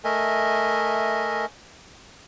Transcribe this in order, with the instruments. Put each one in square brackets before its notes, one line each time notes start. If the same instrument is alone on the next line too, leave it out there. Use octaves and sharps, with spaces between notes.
[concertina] A3 A#4 D#5 E5 G#5